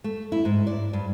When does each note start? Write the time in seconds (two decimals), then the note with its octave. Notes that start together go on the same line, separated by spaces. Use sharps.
0.04 A3
0.32 E4
0.45 G#2
0.67 D5
0.93 G2